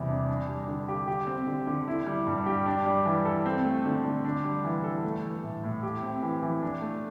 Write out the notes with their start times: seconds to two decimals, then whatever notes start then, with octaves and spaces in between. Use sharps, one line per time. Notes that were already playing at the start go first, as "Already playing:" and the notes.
Already playing: E2 C3 G3
0.08 D4
0.29 D4
0.48 G3
0.68 D3
0.88 G4
1.07 G4
1.27 C4
1.47 D3
1.67 D3
1.88 E4
2.07 G3
2.27 G2
2.46 G4
2.66 D4
2.86 G3
3.06 E3
3.25 A4
3.46 C4
3.65 A3
3.85 D3
4.04 D3
4.25 D4
4.44 G3
4.65 E3
4.84 A4
5.04 A3
5.24 E3
5.43 A2
5.64 A2
5.83 G4
6.02 C4
6.23 E3
6.42 E3
6.62 D4
6.82 A3